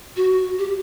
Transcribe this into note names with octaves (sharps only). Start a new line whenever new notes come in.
F#4
G4